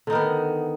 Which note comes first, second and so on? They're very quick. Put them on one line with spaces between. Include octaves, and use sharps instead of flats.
D3 D#4 D#3 B3